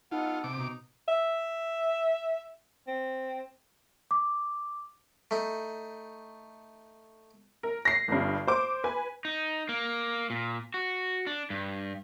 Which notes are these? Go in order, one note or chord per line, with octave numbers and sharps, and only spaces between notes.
B3 D#4 F4 A4 F#5
C3 D6
B2 D#4
E5
C4
D6
A3 D#4
A#4
A#6 C7
G1 G2
C5 D6
B4 G#5
D#4
A#3
A#2
F#4
D4
G2